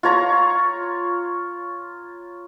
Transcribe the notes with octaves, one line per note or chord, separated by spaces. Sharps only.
F4 C#5 A#5